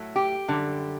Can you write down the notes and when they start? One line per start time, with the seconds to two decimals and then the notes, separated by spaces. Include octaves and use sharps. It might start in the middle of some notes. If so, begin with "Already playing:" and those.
Already playing: A2 F#3 A3
0.16 G4
0.48 F#2 D3 G3